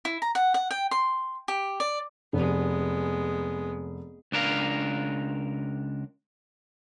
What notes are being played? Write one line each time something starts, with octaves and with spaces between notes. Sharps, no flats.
E4
A#5
F#5
F#5
G5
C6
G4
D5
F1 G#3 B3
C#2 D4 A#4 F5